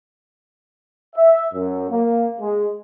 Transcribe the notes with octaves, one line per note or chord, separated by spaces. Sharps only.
E5
F#2
A#3
G#3